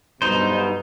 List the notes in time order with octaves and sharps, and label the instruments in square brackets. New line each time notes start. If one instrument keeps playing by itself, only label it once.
[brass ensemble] B1 G2 B2 [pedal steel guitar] D#4 C5